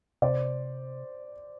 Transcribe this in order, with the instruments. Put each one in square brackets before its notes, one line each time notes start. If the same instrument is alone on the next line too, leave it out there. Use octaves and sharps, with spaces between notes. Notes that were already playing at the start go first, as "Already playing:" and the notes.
[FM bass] C3 [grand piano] C5 D5